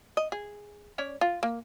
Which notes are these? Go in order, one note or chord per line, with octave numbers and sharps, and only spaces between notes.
D#5
G#4
C#4 C#5 D5
F4
A#3